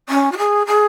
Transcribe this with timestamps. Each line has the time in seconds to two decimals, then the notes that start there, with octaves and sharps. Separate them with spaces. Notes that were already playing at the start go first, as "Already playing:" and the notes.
0.09 C#4
0.32 F#4
0.37 G#4
0.67 G#4